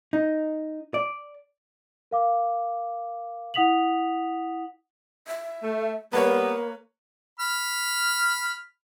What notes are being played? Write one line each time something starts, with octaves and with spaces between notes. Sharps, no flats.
D#4
D5
A#4 F5 D6
E4 F#5 D#6 B6 F7 F#7
E5
A3
G3 A#3 B3 B4 C#5
B5 F6